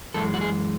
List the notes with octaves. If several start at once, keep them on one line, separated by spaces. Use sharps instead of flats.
F#2 E3 G#3 A4
F#4
G#4